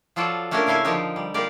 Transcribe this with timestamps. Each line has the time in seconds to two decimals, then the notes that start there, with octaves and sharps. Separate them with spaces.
0.16 F3 F#3 F4 A4 D5
0.51 A3 A#3 C#4 D4 G4 A#4
0.67 C#3 E4 A4 F5 G#5
0.84 D3 F3 D#4 G4 A#4
1.16 G3
1.34 F4 G4 A#4 D5